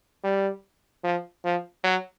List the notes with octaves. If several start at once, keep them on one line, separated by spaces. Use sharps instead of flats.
G3
F3
F3
F#3